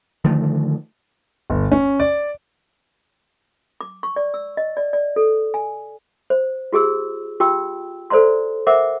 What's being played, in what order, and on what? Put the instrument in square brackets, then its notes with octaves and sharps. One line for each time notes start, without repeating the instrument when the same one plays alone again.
[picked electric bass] D3 D#3 F3 A3
[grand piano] G1
C#4
D5
[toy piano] D6
C#6
D5
E6
D#5
D5
D5
A4
G#5
C5
F4 G4 G#4 E6
F4 G4 G5 E6
A4 C5 D5 A#5 C6
A#4 C5 E5 F#5 D6